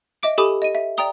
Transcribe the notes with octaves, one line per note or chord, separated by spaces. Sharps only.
D#5 E5 D6 D7
G4 A4 G#5 B5 D6 D#6
D#5 D#7
E5
D5 E5 G5 A#5 D#6 G7